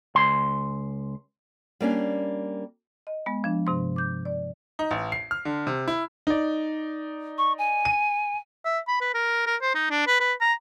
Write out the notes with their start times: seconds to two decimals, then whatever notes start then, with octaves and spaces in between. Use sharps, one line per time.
0.15 C#2 C6
1.80 G3 A#3 C#4 D4
3.07 D#5
3.26 G#3 B3
3.44 F3 D4
3.67 G2 C3 C6
3.96 D6 G6
4.25 D5
4.79 D#4
4.91 A1
5.12 C7
5.31 F6
5.45 D3
5.67 C3
5.88 E4
6.27 D#4 D5
7.38 C#6
7.58 G#5
7.85 D#7
8.65 E5
8.88 B5
9.01 B4
9.14 A#4
9.46 A#4
9.61 C5
9.75 D#4
9.90 D4
10.07 B4
10.20 B4
10.41 A#5